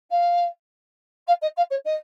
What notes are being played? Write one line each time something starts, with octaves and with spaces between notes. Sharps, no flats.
F5
F5
D#5
F5
C#5
D#5